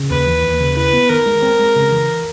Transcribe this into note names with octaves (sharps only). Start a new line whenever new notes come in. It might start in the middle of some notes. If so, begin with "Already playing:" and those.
Already playing: C#3
D#2 B4
E3
D#2
C#3
E4 B4
B3
D#3 A#4
G#3
C4
G#3
C#3
E3